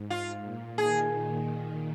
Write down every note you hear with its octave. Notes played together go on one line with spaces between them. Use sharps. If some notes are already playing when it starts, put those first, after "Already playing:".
Already playing: G#2
G#2 F4
A#2
D#3 G#4